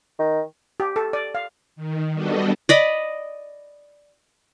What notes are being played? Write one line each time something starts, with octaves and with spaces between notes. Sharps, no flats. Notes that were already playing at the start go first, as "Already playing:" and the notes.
D#3
G4
A4
D5
F5
D#3
G3 B3 D4 F#4 A4 D#5
D5 D#5 B5